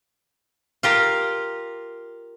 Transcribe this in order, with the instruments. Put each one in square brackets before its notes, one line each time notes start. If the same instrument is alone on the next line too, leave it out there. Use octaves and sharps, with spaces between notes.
[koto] F4 G4 A#4